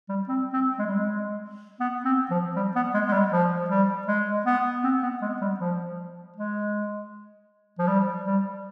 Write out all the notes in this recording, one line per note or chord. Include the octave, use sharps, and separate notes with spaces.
G3
C4
C4
G#3
G3
G#3
B3
C4
F3
G3
B3
G#3
G#3
G3
F3
G3
G#3
B3
C4
B3
G#3
G3
F3
G#3
F3
G3
G3